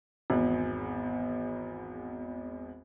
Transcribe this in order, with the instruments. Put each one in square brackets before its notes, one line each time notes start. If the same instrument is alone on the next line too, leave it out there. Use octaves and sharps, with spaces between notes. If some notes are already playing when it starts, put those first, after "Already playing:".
[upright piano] G#1 E2